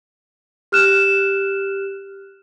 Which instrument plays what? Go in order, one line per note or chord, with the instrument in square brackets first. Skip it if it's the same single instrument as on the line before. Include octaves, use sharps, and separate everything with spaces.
[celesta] G4 F6 F#6 E7